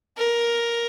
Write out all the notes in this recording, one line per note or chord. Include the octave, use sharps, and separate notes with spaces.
A#4